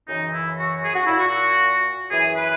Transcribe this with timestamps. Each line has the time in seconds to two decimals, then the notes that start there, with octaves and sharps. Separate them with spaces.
0.06 F#2 C#3 E3 D#4
0.32 E4
0.57 F#4
0.83 G#4
0.94 F#4
1.06 A#2 E4
1.18 F#4
2.09 F#2 E3 G#4
2.35 B4